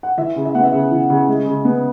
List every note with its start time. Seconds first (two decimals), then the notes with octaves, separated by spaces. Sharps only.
0.03 F#5
0.17 E3 E5
0.36 C#3
0.45 E5
0.55 B3 F#5
0.64 E5
0.73 C#3
0.91 E3
1.10 C#3
1.28 G#3
1.46 C#3
1.65 B3